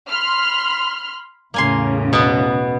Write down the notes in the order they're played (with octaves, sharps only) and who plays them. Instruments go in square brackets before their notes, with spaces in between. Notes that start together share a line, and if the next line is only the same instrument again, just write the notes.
[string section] B5 C6 F6
[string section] E2 A2 C#3 [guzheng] A#3 G#5 C6
[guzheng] B2 B3